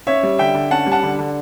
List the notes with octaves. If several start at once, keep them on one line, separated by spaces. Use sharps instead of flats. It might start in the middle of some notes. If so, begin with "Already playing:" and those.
C#4 C#5 E5
G3
D3 E5 G5
D3
C#4 F#5 A5
G3
F#5 A5
D3
D3